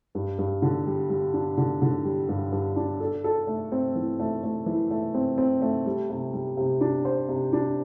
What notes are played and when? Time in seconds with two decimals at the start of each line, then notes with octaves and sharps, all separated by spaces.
0.15 G2
0.39 G2
0.62 D3
0.87 G3
1.10 G3
1.34 D4
1.58 D3
1.82 D3
2.05 G3
2.29 G2
2.52 G2
2.76 D4
3.00 A4
3.24 A4
3.47 A3
3.72 C4
3.95 E3
4.20 A3
4.44 A3
4.66 E3
4.91 A3
5.14 C4
5.38 C4
5.62 A3
5.86 G3
6.10 C3
6.33 G3
6.57 C3
6.81 D4
7.05 C5
7.29 C3
7.53 D4